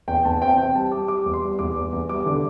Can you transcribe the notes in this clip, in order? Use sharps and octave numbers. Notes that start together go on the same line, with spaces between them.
E2 G5
E2 A5
C4 G5
C4 G5
G3 A5
G3 D6
G3 D6
E2
C6
G3
E2 D6
E2
E2
G3 D6
D3